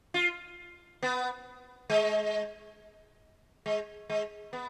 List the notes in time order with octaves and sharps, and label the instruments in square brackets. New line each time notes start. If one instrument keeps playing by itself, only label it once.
[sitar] F4
B3
G#3
G#3
G#3
B3